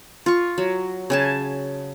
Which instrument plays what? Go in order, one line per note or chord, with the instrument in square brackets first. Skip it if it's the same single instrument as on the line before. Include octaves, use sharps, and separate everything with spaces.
[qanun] F4 C#6
F#3
C#3 G#5 A5